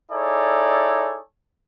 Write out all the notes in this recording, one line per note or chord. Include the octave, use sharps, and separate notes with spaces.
D#4 E4 G#4 A4 C#5 D5